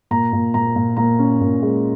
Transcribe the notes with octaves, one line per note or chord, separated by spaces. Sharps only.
A#2 A#5
A#2
A#2 A#5
A#2
A#2 A#5
C#4
A#2
G#3